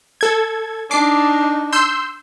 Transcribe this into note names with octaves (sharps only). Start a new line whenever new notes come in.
A4 G#6
D4 D#4 D6 C7
C6 E6 G6